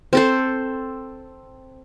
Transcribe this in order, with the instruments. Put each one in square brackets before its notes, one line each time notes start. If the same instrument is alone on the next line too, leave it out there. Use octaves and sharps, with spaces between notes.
[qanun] C4 A4 C5